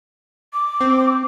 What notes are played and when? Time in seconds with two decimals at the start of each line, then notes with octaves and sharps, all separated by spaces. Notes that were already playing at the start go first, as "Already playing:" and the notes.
0.54 D6
0.81 C4